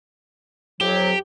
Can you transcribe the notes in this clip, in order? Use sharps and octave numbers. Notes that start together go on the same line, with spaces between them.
F2 F#3 G4